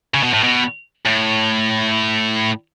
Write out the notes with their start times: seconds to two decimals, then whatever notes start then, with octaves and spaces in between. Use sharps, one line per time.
0.14 C#3
0.23 B2
0.33 A2
0.43 B2
1.05 A2